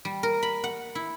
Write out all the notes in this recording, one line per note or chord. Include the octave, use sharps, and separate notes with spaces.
G3
A#4
B5
F#5
E4